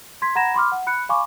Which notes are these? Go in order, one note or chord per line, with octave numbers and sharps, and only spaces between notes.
C6 G#6 B6
F#5 A#5 B5 G#6 A#6 E7
B5 C6 D6 F6
F#5
B5 F#6 C#7
F5 G#5 B5 C#6 D6